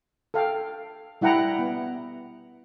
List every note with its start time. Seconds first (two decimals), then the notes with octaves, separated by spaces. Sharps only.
0.34 A4 F5 G5
1.21 G3 E4 F#5 G5 A#5
1.59 B3